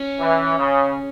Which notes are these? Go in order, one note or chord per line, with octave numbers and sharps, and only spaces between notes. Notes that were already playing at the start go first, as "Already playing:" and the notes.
Already playing: C#4
E3
C#3